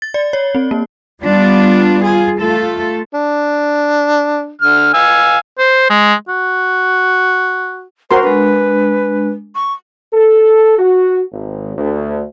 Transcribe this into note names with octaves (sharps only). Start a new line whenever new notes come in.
A6
D5
C#5
C4
A#3
G3 B3 D4 F4
F4 G#4
A3 F4 A4
D4
D3 F6
F5 G#5 E6
C5
G#3
F#4
F#4 A#4 C5 C6
G#3 D4 B4
C#6
A4
F#4
G#1
D2